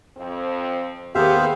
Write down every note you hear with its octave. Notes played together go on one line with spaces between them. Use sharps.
F2 C4
D#2 B3 G4 G#4 A#4 C5 E5 F5